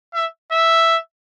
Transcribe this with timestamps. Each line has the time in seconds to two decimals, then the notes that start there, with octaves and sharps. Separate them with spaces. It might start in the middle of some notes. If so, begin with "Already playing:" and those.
0.14 E5
0.52 E5